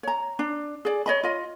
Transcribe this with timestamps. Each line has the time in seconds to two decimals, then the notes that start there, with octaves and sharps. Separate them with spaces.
0.03 C#5 A#5
0.39 D4
0.85 G#4 D5
1.06 C#5 D#5 B5
1.23 F4 D#5